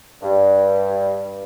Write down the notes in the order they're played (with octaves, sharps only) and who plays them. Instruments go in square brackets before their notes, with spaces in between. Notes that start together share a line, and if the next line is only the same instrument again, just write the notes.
[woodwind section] G2